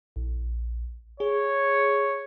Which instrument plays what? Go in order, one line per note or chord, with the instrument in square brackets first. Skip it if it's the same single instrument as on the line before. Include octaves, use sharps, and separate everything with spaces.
[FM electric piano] A#1
[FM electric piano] G#4 [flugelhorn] C#5